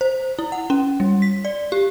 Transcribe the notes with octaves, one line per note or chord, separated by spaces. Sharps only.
C5
E4
F#5
C#4
G3
B6
D5
G4